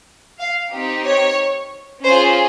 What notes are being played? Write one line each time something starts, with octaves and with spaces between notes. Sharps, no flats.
F5
C4 D#4 G4
C#5
C#4 F4 G#4 C5